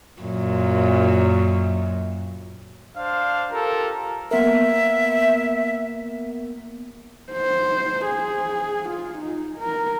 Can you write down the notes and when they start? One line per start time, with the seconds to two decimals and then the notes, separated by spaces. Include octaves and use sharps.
0.22 F#2 A#2
2.97 D4 C5 F5
3.51 F4 G4 A4 A#4
4.31 A#3 B3 A#4 E5
7.33 C5
8.06 G#4
8.89 F4
9.18 D#4
9.58 A#4